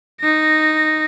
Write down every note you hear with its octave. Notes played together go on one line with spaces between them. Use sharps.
D#4 A#6